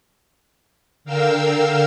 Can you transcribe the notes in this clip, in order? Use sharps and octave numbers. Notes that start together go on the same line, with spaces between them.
D3 A#4 F5 G5 E6